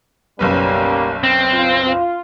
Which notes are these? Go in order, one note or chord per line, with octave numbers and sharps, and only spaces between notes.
F#1 B1 G3 A#3 C#4 B4
C4
F4
F4